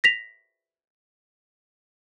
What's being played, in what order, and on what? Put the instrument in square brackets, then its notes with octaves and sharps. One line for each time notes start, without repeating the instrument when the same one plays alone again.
[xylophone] A#6 B6 F7